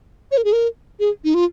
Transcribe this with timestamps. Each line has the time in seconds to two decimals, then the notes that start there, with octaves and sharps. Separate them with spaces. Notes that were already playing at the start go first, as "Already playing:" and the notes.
0.31 C#5
0.37 A#4
0.44 G#4
0.53 A#4
1.00 G#4
1.24 D#4
1.34 F4